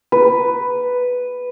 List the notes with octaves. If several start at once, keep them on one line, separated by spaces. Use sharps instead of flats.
B4